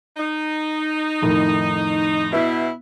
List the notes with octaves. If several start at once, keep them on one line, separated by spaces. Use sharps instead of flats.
D#4
F2 A2 D#3
B2 B3 E4 E5